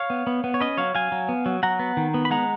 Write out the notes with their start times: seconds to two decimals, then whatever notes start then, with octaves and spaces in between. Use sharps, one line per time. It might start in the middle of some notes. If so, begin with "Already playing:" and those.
Already playing: C#5 F5
0.10 B3
0.27 B3
0.44 B3
0.54 C#5
0.61 C#4 B4 D#5
0.78 F#3 C#5 F5
0.95 F#3 F5 G#5
1.12 F#3
1.29 B3
1.46 F#3
1.63 F#3 F#5 A#5
1.79 B3
1.97 D#3
2.14 B3
2.25 B5
2.31 G#3 F#5 A#5